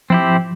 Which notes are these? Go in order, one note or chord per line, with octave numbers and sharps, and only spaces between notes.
F3 C4 E4 G4